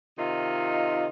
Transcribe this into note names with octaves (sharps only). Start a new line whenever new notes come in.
C3 D#3 D#4 F4